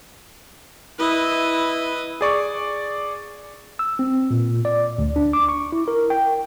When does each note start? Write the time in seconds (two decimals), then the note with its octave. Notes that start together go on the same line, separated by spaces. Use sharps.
0.98 E4 B4 D#5
2.21 G#4 D5 C#6
3.79 E6
3.99 C4
4.31 A#2
4.65 D5
4.98 D2
5.16 D4
5.33 D6
5.49 C#6
5.72 E4
5.88 A#4
6.10 G5